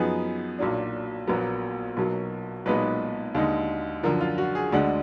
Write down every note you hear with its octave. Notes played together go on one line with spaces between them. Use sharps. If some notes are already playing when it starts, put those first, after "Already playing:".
Already playing: F#2 F3 B3 D#4 G#4
B1 A#2 F#3 D4
A#1 A#2 F#3 B3 A#4
B1 B2 F#3 A#3
B1 A#2 G#3 B3 D#4 B4
D#2 D3 G#3 D#4
F#2 D3 F3 A#4
F4
F#4
G#4
D2 D3 G#3 D4 F#5